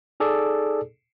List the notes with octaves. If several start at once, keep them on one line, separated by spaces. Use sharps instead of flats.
D#4 G#4 A4 D5